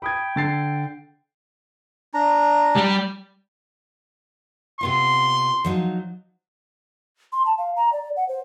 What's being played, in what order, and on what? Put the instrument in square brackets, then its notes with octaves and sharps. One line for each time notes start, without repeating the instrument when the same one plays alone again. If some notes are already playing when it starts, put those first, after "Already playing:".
[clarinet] G5 [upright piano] B5 D#6 G#6
[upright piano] D3 A6 C7
[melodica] D4 A#5
[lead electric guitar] G3
[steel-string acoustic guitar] C3 B3 F4 [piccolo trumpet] C6
[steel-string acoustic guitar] F3 F#3 D#4
[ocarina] C6
A5
F5
A#5
D5
F#5
C5